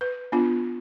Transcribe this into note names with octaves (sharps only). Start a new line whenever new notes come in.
B4
B3 D4 F4